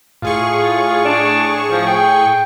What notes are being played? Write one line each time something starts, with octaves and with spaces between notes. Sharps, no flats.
A2 F4 G#4 C#6
D4
F3
G5